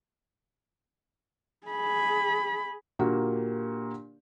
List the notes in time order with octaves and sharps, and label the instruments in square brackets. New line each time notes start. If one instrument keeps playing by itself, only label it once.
[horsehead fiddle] G#4 B5
[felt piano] A#2 D3 A#3 F#4 G4